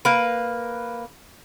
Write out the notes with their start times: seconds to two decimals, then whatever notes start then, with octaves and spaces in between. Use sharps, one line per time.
0.05 A#3 B4